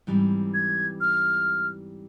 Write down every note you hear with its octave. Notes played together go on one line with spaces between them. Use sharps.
G#2 E3 G3 C4
G#6
F6